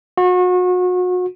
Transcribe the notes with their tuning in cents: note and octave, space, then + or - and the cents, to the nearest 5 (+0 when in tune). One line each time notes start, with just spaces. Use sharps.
F#4 -35